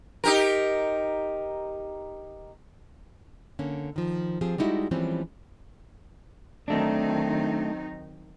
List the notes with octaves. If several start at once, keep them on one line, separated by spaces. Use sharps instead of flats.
D#4 G4 A#4
D3 A#3 C#4
D#3 F3
F3 C4 G4 G#4
G3 G#3 D#4 E4 F#4
E3 F3 G3 G#3 C4 C#4
D#3 F#3 A3 C4 D4 D#4